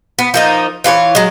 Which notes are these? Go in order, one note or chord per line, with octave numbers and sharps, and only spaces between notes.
B3
F3 A#3 D#4
E3 F4 G4 C#5
F#3 G#3